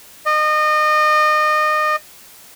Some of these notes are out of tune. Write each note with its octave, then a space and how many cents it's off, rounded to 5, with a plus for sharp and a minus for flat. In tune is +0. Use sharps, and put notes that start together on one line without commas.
D#5 -30